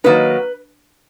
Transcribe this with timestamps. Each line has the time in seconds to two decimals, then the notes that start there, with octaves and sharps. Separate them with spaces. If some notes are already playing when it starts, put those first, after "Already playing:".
0.04 D#3 F#3 A#3 D#4 B4